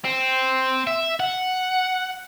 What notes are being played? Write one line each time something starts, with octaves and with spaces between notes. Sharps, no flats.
C4
E5
F#5